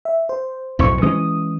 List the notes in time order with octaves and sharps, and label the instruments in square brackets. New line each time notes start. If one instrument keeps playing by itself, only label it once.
[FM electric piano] E5
C5
[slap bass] B1 F2 A2 [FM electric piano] C4 C5 C#6
[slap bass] E3 G#3 C#4 [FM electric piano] D#6